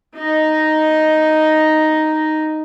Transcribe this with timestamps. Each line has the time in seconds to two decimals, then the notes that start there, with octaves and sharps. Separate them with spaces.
0.16 D#4 D#5